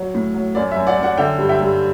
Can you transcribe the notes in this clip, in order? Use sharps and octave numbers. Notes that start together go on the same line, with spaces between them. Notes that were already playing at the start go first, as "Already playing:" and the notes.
Already playing: F#3
A2
F#3
F#2 D5
E5
F#2
D5 F#5
F#2
D5 F#5
D3 E5 G5
G2
E5 G5
G2